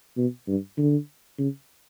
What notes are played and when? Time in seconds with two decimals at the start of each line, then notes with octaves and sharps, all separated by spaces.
0.17 B2
0.47 G2
0.77 D3
1.38 C#3